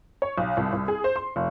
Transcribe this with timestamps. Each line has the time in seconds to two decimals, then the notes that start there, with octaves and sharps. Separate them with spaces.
0.22 C#5
0.38 B1
0.57 C2
0.73 C2
0.88 G#4
1.04 C5
1.16 C6
1.36 F1